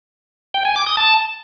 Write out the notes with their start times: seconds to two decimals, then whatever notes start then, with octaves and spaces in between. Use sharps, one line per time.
0.54 G5
0.65 G#5
0.76 D6
0.86 D#6
0.97 A5